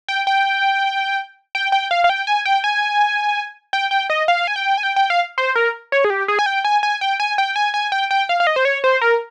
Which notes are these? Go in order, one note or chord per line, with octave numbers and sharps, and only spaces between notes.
G5
G5
G5
G5
F5
F5
G5
G#5
G5
G#5
G5
G5
D#5
F5
G#5
G5
G#5
G5
G5
F5
C5
A#4
C#5
G#4
G4
G#4
G#5
G5
G#5
G#5
G5
G#5
G5
G#5
G#5
G5
G5
F5
F5
D#5
C5
C#5
C5
A#4